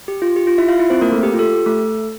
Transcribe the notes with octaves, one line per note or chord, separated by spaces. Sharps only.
G4
F4
G4
F4
E4 E5
F4 F5
E4 E5
C4 C5
A#3 A#4
A3 A4
G4
F4
A4
G4
A3 A4